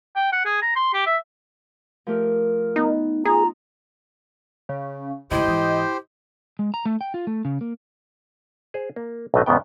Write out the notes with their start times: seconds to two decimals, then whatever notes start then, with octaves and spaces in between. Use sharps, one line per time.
0.16 G5
0.33 F#5
0.45 G#4
0.62 A#5
0.76 C6
0.94 G4
1.07 E5
2.07 F3 A3 G4 A#4
2.76 B3 D#4
3.25 D#4 F4 G#4 A#5
4.69 C#3
5.31 G#2 C#3 E4 G4 C5 D#5
5.44 G#2 E3
6.59 G#3
6.74 A#5
6.86 A3
7.01 G5
7.14 F4
7.27 A3
7.45 C#3
7.61 A#3
8.74 G#4 C5
8.96 A#3
9.34 B1 A2 A3 D4 D#5
9.46 E2 G#2 C#3 B3 G5